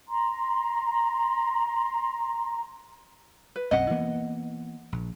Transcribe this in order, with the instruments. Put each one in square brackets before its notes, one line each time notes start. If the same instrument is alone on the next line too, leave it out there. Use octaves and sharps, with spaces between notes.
[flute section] A#5 C6
[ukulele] B4
[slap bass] B1 F#2 C4 [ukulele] D#5 F#5
[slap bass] E3 A#3 B3
A#1